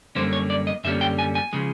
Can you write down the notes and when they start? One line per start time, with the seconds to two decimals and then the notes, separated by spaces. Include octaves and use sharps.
0.15 F#2 D3 G3 A#3 C#4 C5
0.33 C#5
0.50 D5
0.67 D#5
0.84 F#2 D3 G3 A#3 C#4 E5
1.01 G5
1.19 G#5
1.35 G#5
1.53 C#3 F3 G#3